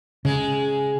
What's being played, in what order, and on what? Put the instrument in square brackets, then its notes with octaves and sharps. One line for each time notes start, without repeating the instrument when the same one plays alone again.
[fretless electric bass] C#3 [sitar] G#3